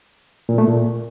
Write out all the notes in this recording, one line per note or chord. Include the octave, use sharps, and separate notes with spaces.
A#2
A3
A#2